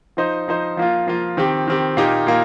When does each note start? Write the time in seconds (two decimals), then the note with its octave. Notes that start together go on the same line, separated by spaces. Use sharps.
0.17 F3 D#4 C5 D#5
0.48 F3 D#4 C5 D#5
0.77 F3 A#3 F4
1.07 F3 A#3 F4
1.37 D#3 C4 G4
1.68 D#3 C4 G4
1.97 A#2 A#3 D#4 G4
2.27 A#2 A#3